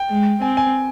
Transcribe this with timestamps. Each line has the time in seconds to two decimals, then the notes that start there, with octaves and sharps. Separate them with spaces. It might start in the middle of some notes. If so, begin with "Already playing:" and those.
Already playing: G5
0.10 G#3
0.41 C4 G#5
0.57 G#5